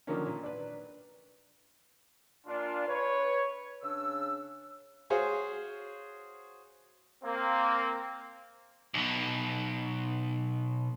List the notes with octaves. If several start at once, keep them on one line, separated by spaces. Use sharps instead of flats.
D3 D#3 F3 F#3 A#3 C#4
A#2
D4 B4
A#2 D4 F4
B4 C#5
C#3 D4 E6
F#4 G#4 C5 C#5 F5
A#3 C4
B1 B2